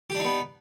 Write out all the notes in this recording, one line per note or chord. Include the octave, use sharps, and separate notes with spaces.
B3 D4 D#4 G4